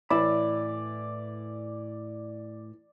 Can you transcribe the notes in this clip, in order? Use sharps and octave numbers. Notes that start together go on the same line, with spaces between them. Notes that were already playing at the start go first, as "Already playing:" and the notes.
A2 E3 D5 E5 B5